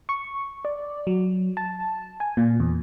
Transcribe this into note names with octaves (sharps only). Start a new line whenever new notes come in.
C#6
D5
F#3
A5
G#5
A#2
E2